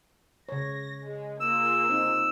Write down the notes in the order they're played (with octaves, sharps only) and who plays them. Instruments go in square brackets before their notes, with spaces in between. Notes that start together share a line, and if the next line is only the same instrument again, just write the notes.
[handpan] C#3 C#5 [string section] A#6
[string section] G#3
[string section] A#3 F4 G#4 [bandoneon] E6
[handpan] C4 D#4